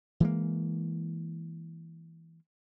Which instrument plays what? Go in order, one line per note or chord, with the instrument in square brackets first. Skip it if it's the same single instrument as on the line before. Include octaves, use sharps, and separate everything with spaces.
[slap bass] E3 G#3 A#3